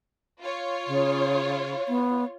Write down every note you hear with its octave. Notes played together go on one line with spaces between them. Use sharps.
F4 C#5
C#3
B3